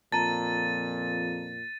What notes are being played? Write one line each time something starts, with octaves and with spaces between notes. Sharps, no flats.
F2 A#2 A5 A#5 A6 D#7